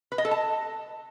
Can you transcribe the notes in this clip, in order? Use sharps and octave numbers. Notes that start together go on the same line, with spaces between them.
B4
D#5
A4
A5